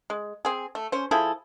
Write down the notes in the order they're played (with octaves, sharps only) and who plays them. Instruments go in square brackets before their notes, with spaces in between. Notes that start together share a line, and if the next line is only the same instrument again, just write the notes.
[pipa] G#3
C4 G#4
A3
C#4 C5
F3 E4 G#4 A4